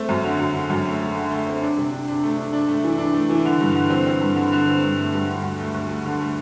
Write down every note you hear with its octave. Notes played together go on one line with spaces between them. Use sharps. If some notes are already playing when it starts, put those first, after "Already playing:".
Already playing: A3 C4
F#2
D3
F#2
D3
F#2
A3
A3
D3
A3
C4
D4
C3
D4
D4
A3
D4
D4
A3
E3
D4
A3
E3
D3
G2
D3
C4
C4
G2
D3
D3
C4
G2
A3
G2
D3
D2
A3
D2
A3
D3
A3